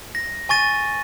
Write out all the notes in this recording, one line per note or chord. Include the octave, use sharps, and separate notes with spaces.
A#6
G#5 C#6 A6 D#7